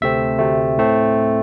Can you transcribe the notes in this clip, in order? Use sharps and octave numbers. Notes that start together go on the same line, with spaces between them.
D2 C3 A3 C4 E5
D2 C3 A3 C4
A2 A3 C4